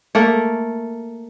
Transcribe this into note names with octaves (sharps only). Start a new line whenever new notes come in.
A3 A#3